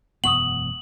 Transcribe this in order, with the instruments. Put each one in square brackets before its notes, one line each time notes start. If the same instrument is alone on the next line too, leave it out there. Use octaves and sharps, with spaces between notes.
[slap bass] E1 F#2 B3 [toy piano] F#5 C#6 D#6 [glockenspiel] F#7